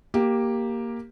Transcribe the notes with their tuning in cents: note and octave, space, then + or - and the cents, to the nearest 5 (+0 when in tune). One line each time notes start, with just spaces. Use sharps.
A#3 +0 G4 +0